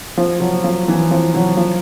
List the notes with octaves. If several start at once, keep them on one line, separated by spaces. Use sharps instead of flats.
F3
F#3
F3
E3
F3
F#3
F3